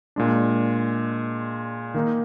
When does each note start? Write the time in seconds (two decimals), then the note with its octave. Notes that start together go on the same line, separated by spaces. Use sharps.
0.16 A#2 G#3 D4
1.94 D#3 A#3 D#4